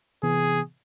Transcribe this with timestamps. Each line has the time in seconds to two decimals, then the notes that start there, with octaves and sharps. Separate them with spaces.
0.23 C3 E3 B3 G#4